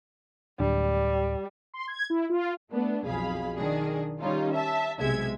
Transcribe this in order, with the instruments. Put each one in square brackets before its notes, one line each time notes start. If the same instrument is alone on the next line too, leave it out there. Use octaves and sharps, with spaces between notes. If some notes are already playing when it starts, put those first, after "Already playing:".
[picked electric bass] D1 D4 [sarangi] G3
[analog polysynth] C6
G#6
E4
F4
[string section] A3 B3 D4
B1 F2 G#4 F5 B5
D#3 D4 G#4
D#3 G3 C#4 D#4 F4
E5 A5
B1 C3 G#3 E5 G#6